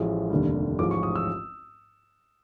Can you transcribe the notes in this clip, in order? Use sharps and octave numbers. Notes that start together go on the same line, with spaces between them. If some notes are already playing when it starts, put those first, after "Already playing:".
Already playing: A1 A2 F3 G#3
F1 D#2 D3 G3
A1 G#2 F3 G#3 D6
C#6
D#6
E6